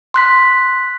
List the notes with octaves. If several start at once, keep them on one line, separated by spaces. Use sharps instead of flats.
C6 F#6 B6